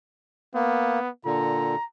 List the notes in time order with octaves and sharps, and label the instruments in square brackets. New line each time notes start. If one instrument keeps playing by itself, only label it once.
[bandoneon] A#3 [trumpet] B3
[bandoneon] A#2 D3 [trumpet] A#5